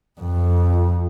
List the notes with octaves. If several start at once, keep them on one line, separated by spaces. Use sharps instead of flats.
F2